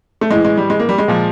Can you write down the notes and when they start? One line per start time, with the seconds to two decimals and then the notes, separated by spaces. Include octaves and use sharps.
0.21 A3
0.31 A2 E3 G#3
0.45 G#3
0.57 G3
0.70 G#3
0.80 A#3
0.89 G3
0.98 G#3
1.08 A#2 F3